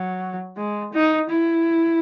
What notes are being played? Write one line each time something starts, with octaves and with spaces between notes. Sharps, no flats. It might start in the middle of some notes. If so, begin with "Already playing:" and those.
Already playing: F#3
G#3
D#4
E4